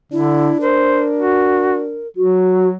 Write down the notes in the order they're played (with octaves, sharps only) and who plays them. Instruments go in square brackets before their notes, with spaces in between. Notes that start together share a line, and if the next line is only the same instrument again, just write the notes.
[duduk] D3 [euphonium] D4 [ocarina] E4
[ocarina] A#4 [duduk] C5
[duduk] F#4
[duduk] F#3 [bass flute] F#4